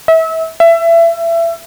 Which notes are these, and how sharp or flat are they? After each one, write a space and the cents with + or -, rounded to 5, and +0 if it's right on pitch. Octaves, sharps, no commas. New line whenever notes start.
E5 -30
E5 +25